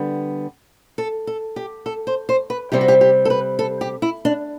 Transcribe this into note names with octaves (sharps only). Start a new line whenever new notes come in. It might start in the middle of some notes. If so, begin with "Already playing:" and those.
Already playing: D3 G3 B3
A4
A4
G4
A4
C5
C5
B4
C3 G3 C4 G4
F#4
G4
G4
A4
B4
A4
G4
E4
D4